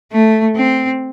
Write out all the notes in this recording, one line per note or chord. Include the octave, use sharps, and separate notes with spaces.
A3
C4